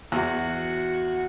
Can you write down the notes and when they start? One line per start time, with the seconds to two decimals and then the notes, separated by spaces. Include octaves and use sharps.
0.12 E2 F#4